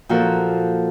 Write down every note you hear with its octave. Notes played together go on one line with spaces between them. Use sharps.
A#2 F3 F#4 A4 A#4